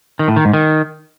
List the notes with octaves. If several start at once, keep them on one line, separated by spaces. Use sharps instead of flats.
D#3
A2
D#3
G#2
D#3